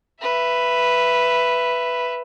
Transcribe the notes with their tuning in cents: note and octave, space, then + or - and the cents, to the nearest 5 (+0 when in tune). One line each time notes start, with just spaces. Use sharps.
B4 +0 E5 +15